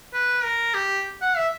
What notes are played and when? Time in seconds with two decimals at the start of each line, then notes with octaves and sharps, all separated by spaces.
0.13 B4
0.44 A#4
0.74 G4
1.21 F#5
1.37 E5